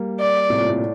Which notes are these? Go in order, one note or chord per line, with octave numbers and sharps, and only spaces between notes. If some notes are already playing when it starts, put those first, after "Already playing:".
Already playing: G3 A#3
D5
A2 C3
A#2
A2